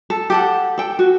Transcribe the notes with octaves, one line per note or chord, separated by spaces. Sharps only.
A4
G4 A4 F#5
A4 G5
F#4